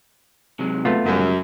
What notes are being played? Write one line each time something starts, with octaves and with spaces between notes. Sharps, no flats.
C3 F#3 G#3
A3 B3 F4
F#2 C#3 G3 G#3